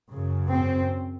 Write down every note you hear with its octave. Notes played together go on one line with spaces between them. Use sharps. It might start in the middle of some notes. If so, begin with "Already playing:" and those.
F#2 C#3
C4